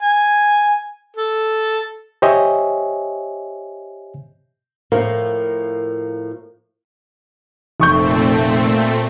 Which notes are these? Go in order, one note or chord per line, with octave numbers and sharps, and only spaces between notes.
G#5
A4
G4 C5 C#5 D#5 E5 G#5
A2 F3 A#3 A#4
F1 A#2 A3 C4 C#6 G6